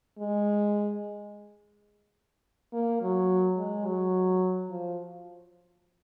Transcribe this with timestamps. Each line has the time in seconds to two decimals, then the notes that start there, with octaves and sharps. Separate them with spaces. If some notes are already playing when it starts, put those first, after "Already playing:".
0.18 G#3
2.73 A#3
3.02 F#3
3.58 G#3
3.85 F#3
4.70 F3